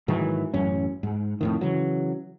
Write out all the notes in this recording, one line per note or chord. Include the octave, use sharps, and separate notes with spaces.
G#2 D#3 E3 F#3
A1 F#2 C#4
G#2
F2 A2 D#3
C#3 E3 F#3